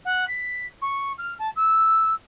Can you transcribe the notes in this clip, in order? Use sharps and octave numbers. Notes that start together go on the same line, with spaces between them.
F#5
B6
C#6
F6
A5
E6